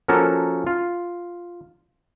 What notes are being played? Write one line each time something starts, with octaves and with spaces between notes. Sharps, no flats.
F3 A#3 C#4 F#4 A4 A#4
F4